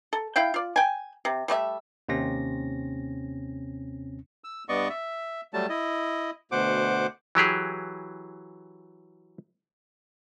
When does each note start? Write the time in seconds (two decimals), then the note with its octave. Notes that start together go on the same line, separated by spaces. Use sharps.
0.13 A4
0.36 E4 F5 G5
0.54 F4 D5
0.76 G5 G#5
1.25 C3
1.48 G3 A3 D4 E5
2.09 D#2 C3 C4 C#4 A#6
4.44 E6
4.69 G2 B3 D5 D#5 C#6
4.90 E5
5.53 F#3 G3 A3 A5
5.69 E4 D#5
6.52 D2 B2 C5 F#5 D6
7.35 E3 F#3 G4 G#4